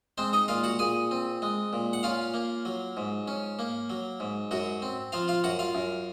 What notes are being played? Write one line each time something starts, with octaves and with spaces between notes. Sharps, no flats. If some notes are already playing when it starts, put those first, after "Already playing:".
G#3 C4 C5
D#4 D#5
A#2 F4 F5
F#4 F#5
A#2 G#4 G#5
C4
G#3
A#2
F#5
C#4 F4 F5
A#3
F#3
G#2
C#4
A#3
F#3
G#2
F#2 F#3 F#4
C4
F3 F4 F5
F4 F5
F#2 F#4 F#5
F4 F5
F#2